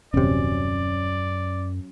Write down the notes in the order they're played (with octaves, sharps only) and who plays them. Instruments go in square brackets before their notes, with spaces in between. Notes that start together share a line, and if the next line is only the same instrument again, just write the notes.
[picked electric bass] D#1 C3 [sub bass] F#2 [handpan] F#3 C#4 [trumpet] D5